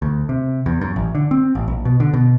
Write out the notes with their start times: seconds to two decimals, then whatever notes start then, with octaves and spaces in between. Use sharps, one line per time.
0.02 D2
0.29 C3
0.66 E2
0.81 F#2
0.96 A1
1.15 D3
1.31 C4
1.55 A1
1.68 A#1
1.85 B2
2.00 D3
2.13 B2